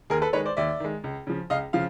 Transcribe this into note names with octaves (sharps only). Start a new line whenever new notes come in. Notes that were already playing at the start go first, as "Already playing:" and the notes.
D#2 G#4 A#4
A4 B4
D#3 G#3 B4 C#5
C5 D5
D#2 D5 E5
D#3 G#3
C#2
C#3 F3
C#2 D#5 F5
C#3 F3 F5